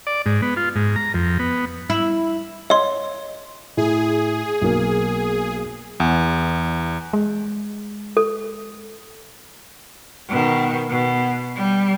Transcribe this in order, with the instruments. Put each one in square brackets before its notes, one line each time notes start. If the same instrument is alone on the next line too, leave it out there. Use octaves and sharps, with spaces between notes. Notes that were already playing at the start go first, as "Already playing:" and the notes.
[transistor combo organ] D5
G#2
B3
F4
G#2
A#5
F2
B3
[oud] E4
[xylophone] C#5 C6 [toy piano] D#5
[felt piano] A2 [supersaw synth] G#4
[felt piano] B1 A#3
[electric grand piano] E2
[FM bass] G#3
[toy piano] A4
[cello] B2 D#3
B2
G3